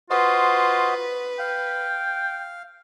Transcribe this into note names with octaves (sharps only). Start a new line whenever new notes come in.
F4 F#4 B4 C5 D#5
F5 G5